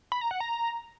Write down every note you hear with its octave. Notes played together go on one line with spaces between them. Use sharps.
B5
A#5
F#5
A#5